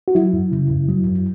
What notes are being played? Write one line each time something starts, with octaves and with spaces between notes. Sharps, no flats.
F#4
F#3 E4
F#2
C#3
F#2
F#3
F#2